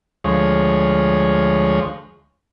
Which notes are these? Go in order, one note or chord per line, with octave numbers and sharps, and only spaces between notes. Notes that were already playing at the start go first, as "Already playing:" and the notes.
D2 F3 G#3 C#5